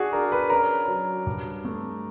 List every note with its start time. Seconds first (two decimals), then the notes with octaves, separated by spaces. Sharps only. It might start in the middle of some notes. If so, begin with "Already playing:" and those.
Already playing: D4 F#4 G#4
0.12 D4 A#4
0.32 B4
0.50 C#4 A#4
0.88 F#3
1.26 G2
1.65 A3